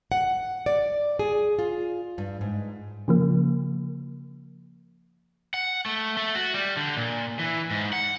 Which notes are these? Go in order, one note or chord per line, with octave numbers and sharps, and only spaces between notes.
F#5
D5
G#4
F4
G2
G#2
C#3 F3 A#3
F#5
A3
A3
F#4
G3
D3
A#2
E3
G#2
F#5